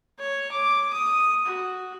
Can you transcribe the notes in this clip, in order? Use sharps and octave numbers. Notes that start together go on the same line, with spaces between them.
C#5
D6
D#6
F#4